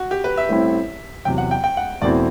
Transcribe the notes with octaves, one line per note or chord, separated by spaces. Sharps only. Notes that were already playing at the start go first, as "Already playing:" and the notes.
Already playing: F#4
G4
B4
E5
A1 A2 G3 C4 E4
E2 C3 F#3 G5
F#5
G5
G5
F#5
E2 B2 A3 C4 E4 D5